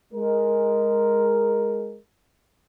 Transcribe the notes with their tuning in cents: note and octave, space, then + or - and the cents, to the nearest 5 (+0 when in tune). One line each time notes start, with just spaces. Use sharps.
G#3 +0 A#4 +0